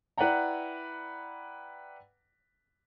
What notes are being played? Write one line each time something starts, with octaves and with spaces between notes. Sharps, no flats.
E4 B4 D5 F#5 G5 A#5